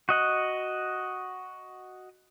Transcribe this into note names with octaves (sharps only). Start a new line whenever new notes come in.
F#4 D#5 F#5